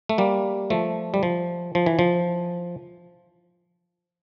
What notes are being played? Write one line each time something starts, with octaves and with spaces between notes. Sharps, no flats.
A3
G3 A#3
F3 A3
G3
F3
F3
E3
F3